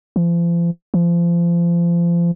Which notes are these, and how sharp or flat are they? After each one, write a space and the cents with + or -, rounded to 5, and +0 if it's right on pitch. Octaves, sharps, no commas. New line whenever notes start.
F3 -40
F3 -30